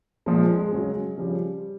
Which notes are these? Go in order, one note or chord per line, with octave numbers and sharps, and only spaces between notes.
A#2 F3 G#3
G#3
C#3 F#3
C#3 F3 G3